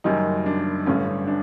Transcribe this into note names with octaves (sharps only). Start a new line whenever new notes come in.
F#1 F#2 D#3 G3 D#4
D4
A1 G2 D3 C#4
D4